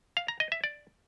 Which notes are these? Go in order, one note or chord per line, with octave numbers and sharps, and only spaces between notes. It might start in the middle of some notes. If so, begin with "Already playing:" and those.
F5
A#5
D#5
E5
D5